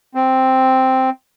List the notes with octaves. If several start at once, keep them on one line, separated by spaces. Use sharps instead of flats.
C4